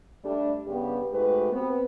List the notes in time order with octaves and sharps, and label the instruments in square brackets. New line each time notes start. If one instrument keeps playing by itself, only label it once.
[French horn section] G3 A3 D4
G2 C#3 B3 G4
G#2 A3 F#4 G4 B4
B3 C4